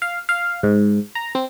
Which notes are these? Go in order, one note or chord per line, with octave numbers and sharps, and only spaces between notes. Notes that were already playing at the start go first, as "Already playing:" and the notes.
F5
F5
G#2
A#5
C4